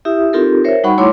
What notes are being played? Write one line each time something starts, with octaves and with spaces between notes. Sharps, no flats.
E4 G4 E5 D#6
C4 D#4 F4 G4 A4 A#4
A#4 C5 C#5 E5
G3 D#4 F#4 F#5 B5 C#6
A3 E4 C#5 C6 D6